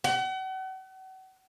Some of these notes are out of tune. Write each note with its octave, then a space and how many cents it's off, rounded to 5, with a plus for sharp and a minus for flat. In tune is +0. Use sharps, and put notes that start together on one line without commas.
F#5 +40